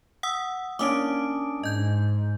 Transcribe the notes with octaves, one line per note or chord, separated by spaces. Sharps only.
F#5 D#6 E6
A#3 C#4 D4 D6 D#6 D7
G#2 D#5 G6